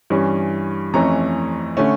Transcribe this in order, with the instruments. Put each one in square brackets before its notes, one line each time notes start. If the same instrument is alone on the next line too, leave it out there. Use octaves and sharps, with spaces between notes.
[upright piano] G2 E3 G3 C#4
F2 E3 A3 C#4 A#5
D3 A3 C#4